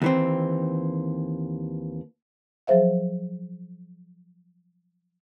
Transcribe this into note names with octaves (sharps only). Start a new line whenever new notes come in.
D#2 E3 C4
F3 F#3 G#4 C5 E5 F5